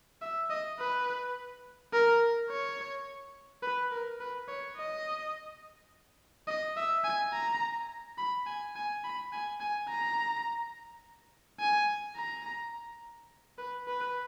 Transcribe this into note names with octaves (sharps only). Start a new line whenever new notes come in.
E5
D#5
B4
A#4
C#5
B4
A#4
B4
C#5
D#5
D#5
E5
G#5
A#5
B5
G#5
G#5
B5
G#5
G#5
A#5
G#5
A#5
B4
B4